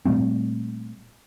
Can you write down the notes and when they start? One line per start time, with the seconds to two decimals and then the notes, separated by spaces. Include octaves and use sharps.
0.05 A#2 G3 A3 C4